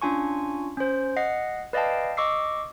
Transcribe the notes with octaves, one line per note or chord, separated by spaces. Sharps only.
C#4 D4 F4 G#5 C#6
C#4 C5
D#5 F#5 C7
B4 D5 D#5 F5 G5 A5
D#5 C#6 D6 E6 C7